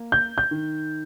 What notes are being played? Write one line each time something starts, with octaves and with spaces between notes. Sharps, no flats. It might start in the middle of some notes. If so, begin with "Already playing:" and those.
Already playing: A#3
G6
G6
D#3